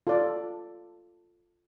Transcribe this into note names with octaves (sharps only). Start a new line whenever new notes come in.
F4 A4 D5